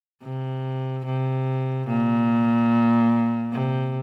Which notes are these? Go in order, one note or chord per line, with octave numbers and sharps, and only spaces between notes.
C3
C3
A#2
C3